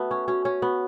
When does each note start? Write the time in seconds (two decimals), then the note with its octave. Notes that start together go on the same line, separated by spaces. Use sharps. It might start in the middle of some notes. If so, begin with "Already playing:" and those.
Already playing: A3 B3 F#4 B4
0.11 C#4 C#6
0.28 C#4 F#4
0.44 C#4 C#5
0.62 B3 F#4